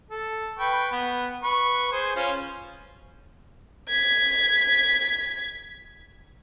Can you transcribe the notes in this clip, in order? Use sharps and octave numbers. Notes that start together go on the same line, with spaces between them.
A4
B4 G5 C#6
B3
B4 C#6
G#4 C5 G#5
C#4 F4 C5
G#6 B6